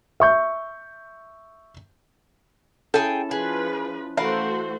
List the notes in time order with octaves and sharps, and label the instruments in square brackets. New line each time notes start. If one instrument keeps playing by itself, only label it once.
[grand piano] E5 C#6 G6
[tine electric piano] C#4 E4 [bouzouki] G#4 G5 [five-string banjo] A4
[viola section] F3 B4 [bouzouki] G#4
[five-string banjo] E3 F5 [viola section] A3 F#4 C5 [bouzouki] A#4